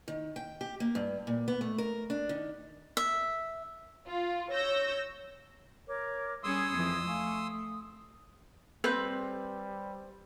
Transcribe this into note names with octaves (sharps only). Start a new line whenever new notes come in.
D#3
G5
G4
A#3
G2
A#2
B3
A3
A#4
D4
D#3
E5
F4
C#5 E6 G6 A#6
A#4 C#5 D6
G3 C#4 G#4 B5 C6 D#6 E6 G#6
F2 E3
A3 F5 G#5 C#6
D#6
G3 C4 B4 G6